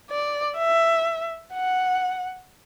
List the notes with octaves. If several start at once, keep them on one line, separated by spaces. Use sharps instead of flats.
D5
E5
F#5